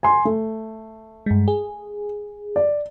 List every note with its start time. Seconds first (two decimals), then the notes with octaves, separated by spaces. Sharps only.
0.03 G#5 C6
0.25 A3
1.26 G2 G#3
1.48 G#4
2.56 D5